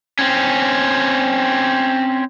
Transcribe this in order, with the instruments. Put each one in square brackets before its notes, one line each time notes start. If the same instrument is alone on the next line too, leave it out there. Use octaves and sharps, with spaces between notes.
[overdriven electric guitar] C4 C#4